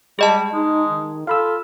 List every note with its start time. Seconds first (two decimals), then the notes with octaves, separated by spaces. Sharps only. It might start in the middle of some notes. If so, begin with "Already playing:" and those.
0.19 G3 G#3 G#4 D#5 A5
0.53 G#3 D#4
0.89 D#3
1.27 F4 A4 F5 B5 E6